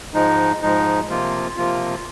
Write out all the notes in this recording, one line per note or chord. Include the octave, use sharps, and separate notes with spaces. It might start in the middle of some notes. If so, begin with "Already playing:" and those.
G#2 F3 G#3 D#4
G#2 F3 G#3 D#4
C3 F3 A#3 F4
C3 F3 A#3 F4